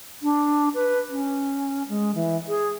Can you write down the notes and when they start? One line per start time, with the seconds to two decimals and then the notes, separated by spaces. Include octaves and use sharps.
0.23 D4
0.75 B4
1.10 C#4
1.89 G#3
2.15 E3
2.48 G#4